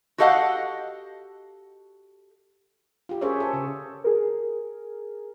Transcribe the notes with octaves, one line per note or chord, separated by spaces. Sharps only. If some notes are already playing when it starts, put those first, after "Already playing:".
F#4 G4 A4 D#5 F5 F#5
F4 G4
C#4 G#4 A#4 C5 C#5 E5
A4
C#3
G#4 A#4